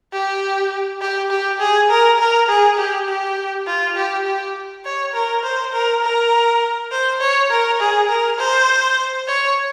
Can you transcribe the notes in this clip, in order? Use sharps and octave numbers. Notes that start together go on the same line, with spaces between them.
G4
G4
G4
G#4
A#4
A#4
G#4
G4
G4
F4
G4
G4
C#5
A#4
C5
A#4
A#4
C5
C#5
A#4
G#4
A#4
C5
C#5